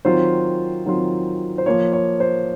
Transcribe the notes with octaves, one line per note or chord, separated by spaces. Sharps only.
D#3 F#3 C4 F4 C5
D#3 F#3 C4 F4
C5
F3 A#3 F4 C#5
C#5
C5